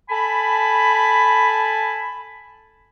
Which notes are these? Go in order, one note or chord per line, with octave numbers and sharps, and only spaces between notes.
A4 G#5 A5 B5